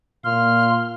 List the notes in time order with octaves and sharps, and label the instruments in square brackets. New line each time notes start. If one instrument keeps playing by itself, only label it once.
[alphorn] A#2 [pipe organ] F5 C6 [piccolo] F6